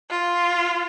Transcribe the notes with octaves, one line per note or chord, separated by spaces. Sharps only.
F4